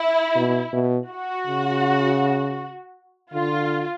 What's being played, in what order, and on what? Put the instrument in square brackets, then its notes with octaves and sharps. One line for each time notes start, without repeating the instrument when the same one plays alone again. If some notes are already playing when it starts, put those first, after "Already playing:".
Already playing: [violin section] E4
[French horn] B2
B2
[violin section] F#4
[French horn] C#3
[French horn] D3 [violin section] F4